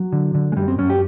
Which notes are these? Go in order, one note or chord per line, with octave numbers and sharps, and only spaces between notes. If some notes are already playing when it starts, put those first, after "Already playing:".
Already playing: F#3
D3
D3
G#3
F#2 G3
C4
F#2 C#4
G4